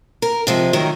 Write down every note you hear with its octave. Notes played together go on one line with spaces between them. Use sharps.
A#4
C3 F3 G#3
D#3 F#3 A3 A#4